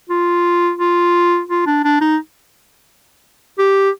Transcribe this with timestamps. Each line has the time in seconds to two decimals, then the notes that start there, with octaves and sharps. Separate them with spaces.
0.09 F4
0.79 F4
1.49 F4
1.66 D4
1.84 D4
2.01 D#4
3.59 G4